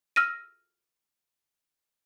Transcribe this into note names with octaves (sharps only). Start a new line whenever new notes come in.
E6 F6 A#6 D#7